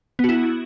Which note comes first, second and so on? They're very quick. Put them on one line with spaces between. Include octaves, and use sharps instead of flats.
B3 F#4 E4